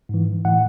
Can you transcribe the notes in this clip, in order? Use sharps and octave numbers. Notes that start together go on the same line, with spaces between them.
G#2 E3
A2 E3 F#5